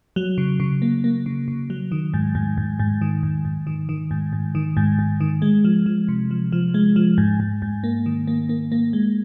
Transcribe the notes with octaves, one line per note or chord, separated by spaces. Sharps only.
F#3
C#3
C#3
A#3
A#3
C#3
C#3
F#3
D#3
G#2
G#2
G#2
G#2
D#3
G#2
G#2
D#3
D#3
G#2
G#2
D#3
G#2
G#2
D#3
G#3
F3
F3
C3
F3
F3
G#3
F3
G#2
G#2
G#2
A#3
D#3
A#3
A#3
A#3
G#3